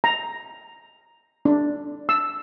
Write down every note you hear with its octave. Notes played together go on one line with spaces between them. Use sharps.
A#5
D4
E6